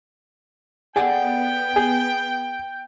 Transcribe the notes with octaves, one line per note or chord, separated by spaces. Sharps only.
B3 G#4 A4 D5 F#5 G5
G#4